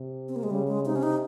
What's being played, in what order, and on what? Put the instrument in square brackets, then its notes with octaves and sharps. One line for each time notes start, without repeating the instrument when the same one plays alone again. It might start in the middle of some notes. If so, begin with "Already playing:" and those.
Already playing: [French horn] C3
[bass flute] C4
A#3
G#3
[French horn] C#3 [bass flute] G3
[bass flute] G#3
[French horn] C3 [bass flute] D#4
[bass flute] C#4
D#4